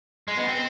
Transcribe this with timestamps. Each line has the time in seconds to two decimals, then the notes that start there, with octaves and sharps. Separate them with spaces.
0.28 G#3
0.37 B3
0.48 C4